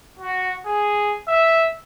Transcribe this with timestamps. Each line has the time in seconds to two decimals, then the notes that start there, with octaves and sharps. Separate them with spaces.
0.19 F#4
0.66 G#4
1.28 E5